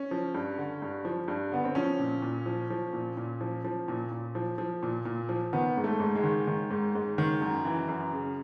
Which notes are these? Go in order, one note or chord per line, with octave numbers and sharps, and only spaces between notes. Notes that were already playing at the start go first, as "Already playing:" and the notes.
Already playing: C#4
F3
G2
D3
G2
F3
G2
D3 B3
C4
F3 C#4
A#2
A#2
F3
F3
A#2
A#2
F3
F3
A#2
A#2
F3
F3
A#2
A#2
F3
D#3 B3
G#2
A3
G#2
G#3
D#3
D#3
G#2
G#2
D#3
F#2
E3
F#2
C#3